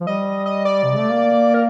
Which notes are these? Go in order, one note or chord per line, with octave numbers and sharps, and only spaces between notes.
F3
G3 D#5
D#5
D5
C3
A3
A#3
A#4